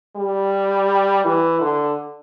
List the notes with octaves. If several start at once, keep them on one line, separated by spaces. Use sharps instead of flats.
G3
E3
D3